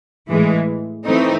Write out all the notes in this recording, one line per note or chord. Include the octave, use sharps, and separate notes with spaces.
A2 E3 G#3
E3 A3 C4 D#4